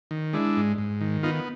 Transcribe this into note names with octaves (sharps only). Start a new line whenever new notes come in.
D#3
G#3 D4 E4
G#2
G#2
D#3
B3 D#4 F4